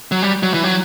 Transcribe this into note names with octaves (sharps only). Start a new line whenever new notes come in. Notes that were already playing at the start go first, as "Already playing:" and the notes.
F#3
G3
F#3
E3
F#3